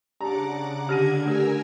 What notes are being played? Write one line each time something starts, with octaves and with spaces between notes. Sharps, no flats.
C#3 D4 G4 F#5 A#5 D6
D3 D4 G4 F6 G#6 A#6 D#7
A3 G4 A#4 G#5 E6